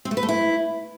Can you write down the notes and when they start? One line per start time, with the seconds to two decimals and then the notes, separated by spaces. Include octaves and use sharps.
0.05 C4
0.11 A3
0.17 B4
0.23 A3
0.29 E4